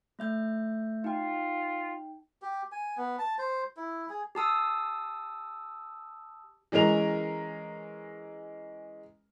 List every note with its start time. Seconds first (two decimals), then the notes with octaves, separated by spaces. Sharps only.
0.19 A3 E5 G6
1.04 D#4 F4 G5
2.42 G4
2.72 G#5
2.97 B3
3.19 A5
3.38 C5
3.77 E4
4.10 G#4
4.35 G4 A5 D#6 E6
6.72 E3 G#3 C#4 A#4 F7